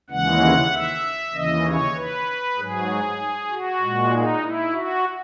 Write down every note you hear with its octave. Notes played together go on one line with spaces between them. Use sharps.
D#2 C#3 E3 G#3 F#5
E5
D#2 C#3 E3 D#5
C#5
B4
G#2 F#3 G#4
F#4
A#2 G#3
D#4
E4
F#4